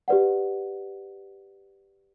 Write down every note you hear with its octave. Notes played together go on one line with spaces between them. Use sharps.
G4 B4 D5 F#5